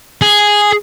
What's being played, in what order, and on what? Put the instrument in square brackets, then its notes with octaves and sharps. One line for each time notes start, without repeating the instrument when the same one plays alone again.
[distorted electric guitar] G#4